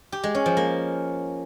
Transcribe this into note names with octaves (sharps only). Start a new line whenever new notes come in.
G4
G#3
C#4
F3
A#3